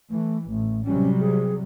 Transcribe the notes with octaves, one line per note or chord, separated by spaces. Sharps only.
E3 A3
A1 A3
C3 F#3 G3 C#4
G#4